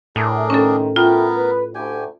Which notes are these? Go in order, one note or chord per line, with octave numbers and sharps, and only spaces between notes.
A2 D4 G#4 A#4
C3 D#3 C#4 A4
A3 B3 F4 A#4 G5
B4
D2 G4 G5 G#5